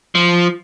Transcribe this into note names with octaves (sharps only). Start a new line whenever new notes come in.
F3